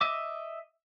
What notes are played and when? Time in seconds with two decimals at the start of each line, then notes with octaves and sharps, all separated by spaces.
0.01 D#5 E5 D6